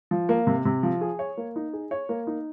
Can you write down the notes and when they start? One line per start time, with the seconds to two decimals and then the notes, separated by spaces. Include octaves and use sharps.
0.11 F3
0.29 A#3
0.47 C3
0.65 C3
0.83 F3
1.01 G#4
1.19 C#5
1.37 A#3
1.56 D#4
1.73 G#4
1.91 C#5
2.09 A#3
2.27 D#4